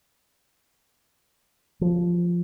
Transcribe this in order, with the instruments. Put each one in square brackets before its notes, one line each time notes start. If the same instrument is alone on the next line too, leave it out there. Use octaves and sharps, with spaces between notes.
[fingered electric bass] F3